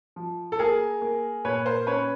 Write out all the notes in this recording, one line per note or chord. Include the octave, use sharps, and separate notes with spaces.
F3
A4
A#3 G#4 A#4
A#3
A#2 B4 C#5
A#4 C5
C#4 B4 C#5